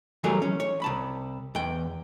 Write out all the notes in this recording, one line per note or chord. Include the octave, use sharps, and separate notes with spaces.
E3 F#3 G3 A3 G#4 A#4
C#4
C#5
C2 A5 B5
E2 G5